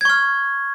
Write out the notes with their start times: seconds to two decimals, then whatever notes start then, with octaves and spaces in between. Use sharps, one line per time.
0.01 G#6
0.05 C#6
0.10 F6